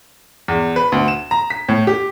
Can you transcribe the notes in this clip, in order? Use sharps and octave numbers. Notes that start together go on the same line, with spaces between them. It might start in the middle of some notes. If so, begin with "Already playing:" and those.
E2
B4
D2
E7
A#5
B6
A2
G4